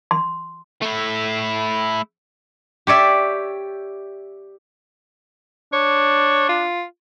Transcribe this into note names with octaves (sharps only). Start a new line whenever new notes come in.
C6
A3 E4
G4 C#5 D5 E5
D4 C#5
F4